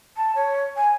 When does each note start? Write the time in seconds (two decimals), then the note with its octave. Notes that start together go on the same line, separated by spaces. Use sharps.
0.17 A5
0.36 C#5
0.77 G#5